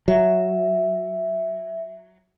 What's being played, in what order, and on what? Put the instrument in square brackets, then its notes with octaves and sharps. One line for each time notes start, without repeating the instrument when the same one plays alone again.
[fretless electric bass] F#3 [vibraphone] E5